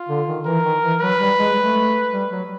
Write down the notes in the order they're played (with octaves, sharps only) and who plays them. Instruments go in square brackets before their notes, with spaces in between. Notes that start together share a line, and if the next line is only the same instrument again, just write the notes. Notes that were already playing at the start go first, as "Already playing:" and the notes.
Already playing: [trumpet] F4
[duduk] D3
D#3
[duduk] E3 [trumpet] A#4
[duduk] D#3
E3
[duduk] F#3 [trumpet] B4
[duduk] G3
G#3
A3
G3
F#3